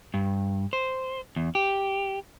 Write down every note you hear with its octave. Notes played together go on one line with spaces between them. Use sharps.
G2
C5
E2
G4